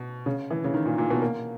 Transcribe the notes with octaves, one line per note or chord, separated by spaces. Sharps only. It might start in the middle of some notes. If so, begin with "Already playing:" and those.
Already playing: B2
C#3
E3
C#3
D#3
A#2
A#2
B2
A#3